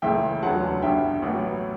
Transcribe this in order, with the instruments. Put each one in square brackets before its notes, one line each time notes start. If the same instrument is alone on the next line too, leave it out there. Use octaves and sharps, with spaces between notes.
[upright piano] C#2 C#3 E3 A3 E5 G5
E1 D2 C#3 F#3 B3 F#5 A5
A1 G2 D3 E5 G5
A1 A2 F#3 B3